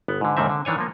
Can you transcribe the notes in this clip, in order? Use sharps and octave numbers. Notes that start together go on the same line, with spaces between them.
G1 B3
G#2 D3
D#2 G#2 D3 D#3 C4 E5
D3
D#3 E3 D4 C#5 G#5
F3 A#3